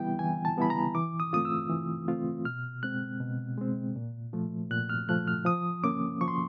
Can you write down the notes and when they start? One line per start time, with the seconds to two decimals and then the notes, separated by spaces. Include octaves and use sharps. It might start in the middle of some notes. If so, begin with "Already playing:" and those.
Already playing: E3 G3 B3 E4 G5
0.19 E3 G#5
0.45 A5
0.57 G3 B3 E4 B5
0.70 A#5
0.95 E3 D6
1.20 D#6
1.33 A3 C4 F4 D#6
1.45 E6
1.70 E3
2.08 A3 C4 F4
2.45 B2 F6
2.83 G#3 C4 F#6
3.20 B2
3.58 G#3 C4
3.96 A#2
4.33 F3 A3
4.71 A#2 F#6
4.89 F6
5.09 F3 A3 F#6
5.28 F6
5.45 F3 D#6
5.84 A#3 C#4 D6
6.21 F3 C#6
6.28 C6